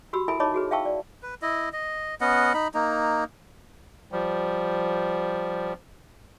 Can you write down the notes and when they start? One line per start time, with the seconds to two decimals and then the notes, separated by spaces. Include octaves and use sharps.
0.13 F#4 G4 B5 E6
0.28 E4 A4 A#4 E5 G#5 B5
0.40 D#4 C#5 D#5 A5 B5 D6
0.54 F#4 G#4 B4
0.71 E5 F5 G5 A5 C#6 E6
0.85 D5
1.23 B4
1.42 E4 D#5
1.73 D#5
2.21 B3 C#4 D#5 F#5
2.54 D#4 B5
2.74 A#3 D#4
4.12 F3 G3